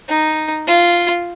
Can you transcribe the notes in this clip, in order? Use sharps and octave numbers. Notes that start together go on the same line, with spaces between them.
D#4
F4